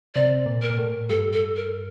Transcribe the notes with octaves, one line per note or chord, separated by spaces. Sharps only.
C3 D5
A#2
A#4
A#2
A2
G2 A4
A4
A#4